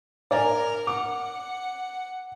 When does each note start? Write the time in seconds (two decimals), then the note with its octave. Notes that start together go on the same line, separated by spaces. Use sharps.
0.31 A#4 D5 G#5 A#5 F6
0.87 F#5 D6